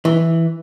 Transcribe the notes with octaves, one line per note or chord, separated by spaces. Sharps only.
E3